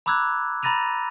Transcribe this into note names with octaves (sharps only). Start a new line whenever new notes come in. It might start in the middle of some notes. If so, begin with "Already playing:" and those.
A#5 B5 D6 E6 F#6 G#6
A#5 B5 A6 A#6 D#7 F7